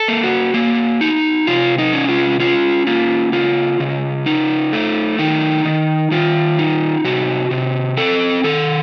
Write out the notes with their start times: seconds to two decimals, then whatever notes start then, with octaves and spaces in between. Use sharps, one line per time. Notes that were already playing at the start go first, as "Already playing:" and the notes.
Already playing: A4
0.08 A#3
0.24 F#4
0.54 A#3
1.01 D#4
1.47 C3 F4
1.78 D#4
1.93 C#4
2.09 F4
2.40 C#4 F4
2.87 A#3 F4
3.32 C#3 F4
3.80 C#3
4.26 D#4
4.73 A3
5.19 D#3 D#4
5.65 D#3
6.11 D#3 F4
6.59 D#4
7.04 C3 F#4
7.51 C3
7.97 C4 A4
8.44 D#3 A4